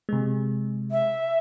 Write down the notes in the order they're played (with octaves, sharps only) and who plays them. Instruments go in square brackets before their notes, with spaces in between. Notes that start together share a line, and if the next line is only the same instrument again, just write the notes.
[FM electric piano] C3 G#3
[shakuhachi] E5